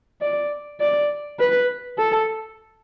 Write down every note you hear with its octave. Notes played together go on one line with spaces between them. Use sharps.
D5
D5
B4
A4